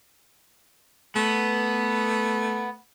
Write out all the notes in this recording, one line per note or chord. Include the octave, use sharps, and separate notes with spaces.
A3 B3